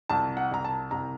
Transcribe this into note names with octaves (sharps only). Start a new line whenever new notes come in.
C2 A5
F#5
C2 A#5
A5
C2 A#5